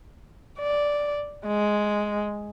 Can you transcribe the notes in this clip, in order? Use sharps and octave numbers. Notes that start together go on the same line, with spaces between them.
D5
G#3